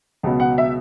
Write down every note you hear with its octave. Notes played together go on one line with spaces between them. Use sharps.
C#2 B2 F#3 B3
F#5
E5